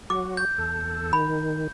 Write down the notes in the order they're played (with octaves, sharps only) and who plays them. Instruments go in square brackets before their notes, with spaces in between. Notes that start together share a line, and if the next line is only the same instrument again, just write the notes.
[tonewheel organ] F#3 F#4 [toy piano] D6
[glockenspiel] G6
[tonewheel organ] E2 A4
[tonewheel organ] D#3 [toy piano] B5